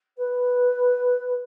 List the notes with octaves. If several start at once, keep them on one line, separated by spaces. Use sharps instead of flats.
B4